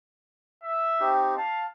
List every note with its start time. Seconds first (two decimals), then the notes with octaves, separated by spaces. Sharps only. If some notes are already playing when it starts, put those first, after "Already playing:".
0.63 E5
1.00 C4 D#4 G4
1.37 F5 A5